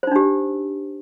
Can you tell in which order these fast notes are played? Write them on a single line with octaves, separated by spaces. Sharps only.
C5 D#4 D4 G4